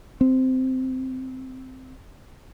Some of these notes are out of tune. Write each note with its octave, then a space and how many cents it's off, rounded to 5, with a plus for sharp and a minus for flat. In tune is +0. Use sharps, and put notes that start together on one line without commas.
C4 -10